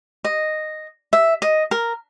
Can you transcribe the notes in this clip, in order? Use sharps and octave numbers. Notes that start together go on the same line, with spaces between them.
D#5
E5
D#5
A#4